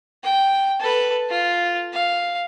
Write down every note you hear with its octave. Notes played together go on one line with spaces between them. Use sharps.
G5
A4 B4
F4
F5